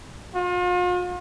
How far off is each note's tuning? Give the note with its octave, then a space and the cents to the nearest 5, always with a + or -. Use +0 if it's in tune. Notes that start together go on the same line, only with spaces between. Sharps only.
F4 +40